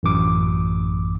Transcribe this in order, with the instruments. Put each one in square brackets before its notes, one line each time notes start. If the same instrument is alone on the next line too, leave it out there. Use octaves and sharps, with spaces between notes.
[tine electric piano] A1 F#2 D6